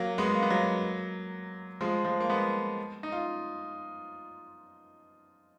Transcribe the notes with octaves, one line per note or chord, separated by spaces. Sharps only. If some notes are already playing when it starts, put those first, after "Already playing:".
Already playing: F#3 A#3
G#3 B3
A#3
B3
F#3 A#3
F3 G#3
F3 G#3
A#3
G#3 B3
D#4
F4